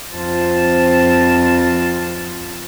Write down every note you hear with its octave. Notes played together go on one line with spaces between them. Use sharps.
F2 C4 F4 C5 A5